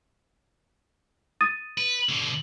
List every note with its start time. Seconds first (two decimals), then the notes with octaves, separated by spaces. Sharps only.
1.41 D#6 A6 D#7
1.78 B4
2.09 B2 D3